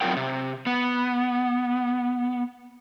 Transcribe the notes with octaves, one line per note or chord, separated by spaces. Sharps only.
F#3 C4 F4 A#4 G5
C3
B3